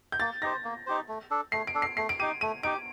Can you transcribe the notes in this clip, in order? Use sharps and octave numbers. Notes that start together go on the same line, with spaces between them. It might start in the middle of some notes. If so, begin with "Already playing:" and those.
G6
A#3 A6
D#4 G4 C5 A#6
A#3
D#4 G4 C5
A3
D4 A4
A3 C7
D7
D4 A4
C7
A3 C7
D7
D#4 G4 D#7
A3 D#7
D#4 G4 D7